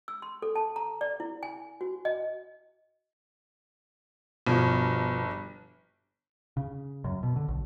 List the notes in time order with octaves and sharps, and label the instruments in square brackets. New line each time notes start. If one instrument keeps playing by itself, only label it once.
[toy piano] E6
C6
A4
A5
A#5
D5
E4
G#5
F#4
D#5
[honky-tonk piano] G1 [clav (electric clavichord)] B2 F3
[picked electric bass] C#3
F#2
B2
D3
B1